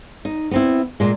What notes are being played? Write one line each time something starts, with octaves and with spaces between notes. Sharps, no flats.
D#4
B3 C4 E4
A#2 G#3